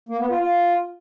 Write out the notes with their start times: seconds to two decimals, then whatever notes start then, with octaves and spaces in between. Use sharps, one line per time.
0.09 A#3
0.19 B3
0.30 F4
0.40 F4